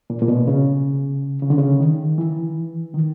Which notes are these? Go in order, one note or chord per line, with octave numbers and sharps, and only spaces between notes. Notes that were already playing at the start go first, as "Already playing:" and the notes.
A#2
A#2
B2
C#3
C#3
D3
C#3
D#3
E3
D#3